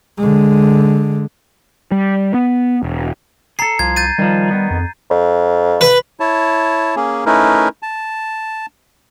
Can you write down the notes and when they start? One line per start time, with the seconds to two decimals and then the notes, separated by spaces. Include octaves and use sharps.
0.18 D3 G#3
1.92 G3
2.34 B3
2.83 E1
3.59 G#4 A4 A#5 C7
3.79 C2 F3 G#6
3.96 G6 A6 D#7
4.18 D#3 F3 G3
4.51 D#3 B3
4.71 F2
5.10 F2
5.81 B4
6.20 E4 C#5 A5
6.96 A#3 C#4 G#4
7.26 A3 C#4 D#4 E4 A#4 B4
7.83 A5